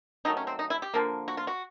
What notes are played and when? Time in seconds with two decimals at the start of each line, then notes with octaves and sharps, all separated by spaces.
0.25 D#3 F#3 A3 D#4
0.37 C#4
0.47 C4
0.59 D#4
0.70 E4
0.82 G4
0.94 D3 F3 A#3
1.28 F#4
1.37 F4
1.47 F#4